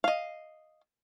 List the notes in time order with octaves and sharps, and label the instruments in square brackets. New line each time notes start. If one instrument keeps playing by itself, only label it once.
[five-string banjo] D#5 F5